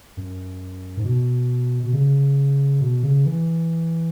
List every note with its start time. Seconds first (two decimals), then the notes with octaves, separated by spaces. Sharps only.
0.17 F#2
0.97 G#2
1.04 B2
1.83 B2
1.93 C#3
2.81 B2
3.03 C#3
3.25 E3